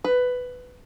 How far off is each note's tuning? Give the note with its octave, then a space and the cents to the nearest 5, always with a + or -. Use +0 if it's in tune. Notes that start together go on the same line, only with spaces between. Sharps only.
B4 +10